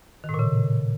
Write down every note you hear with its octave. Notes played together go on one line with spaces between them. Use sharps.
D#3
A2
A#2
C#3